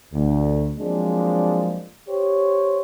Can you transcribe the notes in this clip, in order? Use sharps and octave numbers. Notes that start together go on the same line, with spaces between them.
D2
F3 F#3 G#3 A#3 C4 D4
G4 C5 C#5